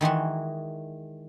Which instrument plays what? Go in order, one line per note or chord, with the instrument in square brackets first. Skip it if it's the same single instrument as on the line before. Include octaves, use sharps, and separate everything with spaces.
[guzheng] D#3 E3 G#3 F#4